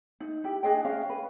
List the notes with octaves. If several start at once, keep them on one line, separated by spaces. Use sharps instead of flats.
D#4
E4 G4
D4 G#4 D#5 G5
C#4 D#5 F5
B4